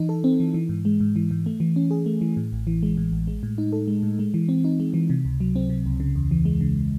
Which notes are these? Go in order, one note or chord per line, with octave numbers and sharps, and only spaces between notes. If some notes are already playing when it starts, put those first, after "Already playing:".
Already playing: E3 D#4
A4
C4
E3
E3
G#2
G#3
G#2
E3
G#2
A3
E3
C#4
G#4
A3
E3
A2
A1
E3
G#3
A2
A1
G#3
A2
D#4
A4
G#3
A2
G#3
E3
C4
D#4
G#3
E3
C3
C#2
F#3
C4
C3
C#2
C#3
E2
E3
G#3
C#3